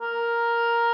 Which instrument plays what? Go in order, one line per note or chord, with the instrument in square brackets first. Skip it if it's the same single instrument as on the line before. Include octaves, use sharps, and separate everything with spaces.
[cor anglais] A#4